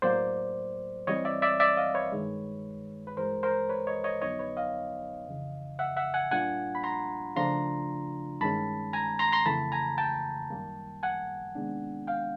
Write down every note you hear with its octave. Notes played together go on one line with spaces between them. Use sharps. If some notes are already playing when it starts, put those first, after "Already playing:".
A2 F#3 A#3 C5 D5
E3 G3 C4 C#5 D#5
D5 E5
D5 E5
D5 E5
D#5 F5
B4 C#5
G2 D#3 G#3
B4
G2 E3 G#3 A#4 C5
A#4 C5
B4 C#5
C#5 D#5
C#5 D#5
F2 D3 F#3 B3 D#4 C#5 D#5
B4 C#5
D#5 F5
F2 C#3 E3
E5 F#5
E5 F#5
F#5 G#5
A#2 G3 A#3 D4 F4 F#5 G#5
B5
A#5 C6
C#3 F3 A3 D4 F4 A#5 C6
G2 D#3 G#3 C#4 A5 B5
G#5 A#5
A#5 C6
A#5 C6
F2 C#3 E3 A3 A5 B5
G#5 A#5
G5 A5
F#2 D#3 G3 A#3
F#5 G#5
C3 D#3 G#3 B3 D4
F5 G5